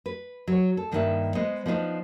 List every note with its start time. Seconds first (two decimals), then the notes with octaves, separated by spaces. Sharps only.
0.06 B4
0.48 F#3 C#5
0.77 A4
0.92 G2 D#3 A#3 D#4 B4 E5
1.35 G#3 B3 C5 D#5
1.66 F3 B3 D4 D#4 C5